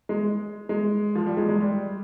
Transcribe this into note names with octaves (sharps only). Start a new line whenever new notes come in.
G#3
G#3
F3
G3
G#3
G#3
G3